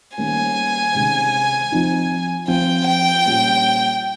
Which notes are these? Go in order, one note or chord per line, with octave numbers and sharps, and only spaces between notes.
D#3 G3 A#3 C#4 G#5
C3 D#3 G#3 C#4
F3 C4 D#4
F3 C4 F4 G5
G5
A#2 G3 C#4 F4